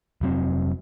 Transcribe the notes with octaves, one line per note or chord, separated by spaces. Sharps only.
F1 F#3 C4